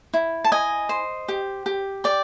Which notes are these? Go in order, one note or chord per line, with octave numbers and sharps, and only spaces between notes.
E4
A5
D#5 G#5
C5
G4
G4
D5 G5